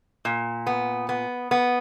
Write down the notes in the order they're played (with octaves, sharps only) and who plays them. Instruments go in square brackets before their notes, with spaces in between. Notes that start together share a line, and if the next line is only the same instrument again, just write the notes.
[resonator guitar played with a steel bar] A#2
B3
B3
B3